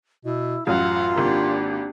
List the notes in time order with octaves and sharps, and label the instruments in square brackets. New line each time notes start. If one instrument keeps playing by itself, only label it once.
[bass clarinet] B2 [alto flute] E4
[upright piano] A1 F#2 [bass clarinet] F4 [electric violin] F5 F#5 [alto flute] C6
[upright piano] G#1 A#3 [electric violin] D4 G4